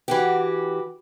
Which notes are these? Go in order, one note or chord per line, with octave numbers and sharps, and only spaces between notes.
E3 F#4 G4